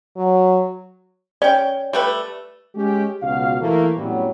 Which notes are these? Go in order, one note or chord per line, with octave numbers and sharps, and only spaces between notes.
F#3
C#4 D5 G5
G3 A3 B4
G#3 C#4 G4
C#2 B2 F#4 F5
E3 A3 A#3
F2 A2 F#3 G3 B3 C#4